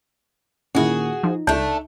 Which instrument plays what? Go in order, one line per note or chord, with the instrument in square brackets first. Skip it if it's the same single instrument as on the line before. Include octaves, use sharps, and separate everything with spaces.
[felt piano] A#2 D#3 [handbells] C#4 E4 [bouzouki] F#4 G#4
[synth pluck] F3 [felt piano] D#4
[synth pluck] C#2 [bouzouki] A3 D4 [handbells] A5 G6